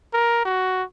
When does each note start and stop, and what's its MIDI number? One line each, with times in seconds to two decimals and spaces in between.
0.13 0.44 70
0.45 0.83 66